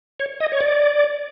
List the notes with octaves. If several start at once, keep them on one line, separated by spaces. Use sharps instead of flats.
C#5
D#5
C#5
D5